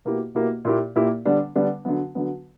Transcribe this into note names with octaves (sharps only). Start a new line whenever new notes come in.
B2 A#3 E4 G4
B2 A#3 E4 G4
A#2 A#3 E4 G4
A#2 A#3 E4 G4
D3 G3 B3 D4
D3 G3 B3 D4
D3 F#3 B3
D3 F#3 B3